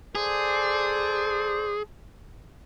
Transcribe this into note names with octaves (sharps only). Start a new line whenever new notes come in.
G#4 A4 C5 D5